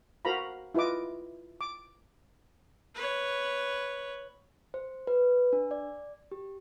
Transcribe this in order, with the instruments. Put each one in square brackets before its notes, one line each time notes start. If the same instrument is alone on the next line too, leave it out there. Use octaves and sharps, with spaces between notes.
[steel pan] F#4 A#4 C5 F5 A#5 B5
E4 F4 B4 D#5 D6
D6
[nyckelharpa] B4 C#5
[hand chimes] C5
B4
D4
D5
G4